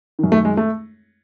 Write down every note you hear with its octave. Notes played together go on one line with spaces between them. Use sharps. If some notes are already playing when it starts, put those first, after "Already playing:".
F#2 D#3
A3
G#3
A3